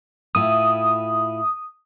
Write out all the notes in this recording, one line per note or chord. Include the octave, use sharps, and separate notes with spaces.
A2 E4 F4 D#6